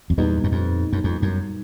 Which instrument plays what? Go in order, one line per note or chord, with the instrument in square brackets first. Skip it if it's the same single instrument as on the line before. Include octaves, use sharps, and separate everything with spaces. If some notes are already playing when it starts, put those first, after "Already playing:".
[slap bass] F2
[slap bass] E2 [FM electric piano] A#2 G3 B3 D#4
[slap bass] F#2
F2
F#2
F2
F#2